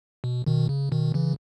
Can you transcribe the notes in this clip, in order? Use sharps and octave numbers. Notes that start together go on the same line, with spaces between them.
B2
B2 D#3
C#3
B2 D#3
C#3 E3